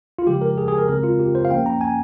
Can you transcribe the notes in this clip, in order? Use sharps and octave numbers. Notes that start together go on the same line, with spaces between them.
F4
C#3 F3 G#3 G4
A#4
G#4
G#4
A#4
C#3 G#3 C4 A#4
F4
G4
C5
F5
F3 A#3 C#4 G5
A#5
G#5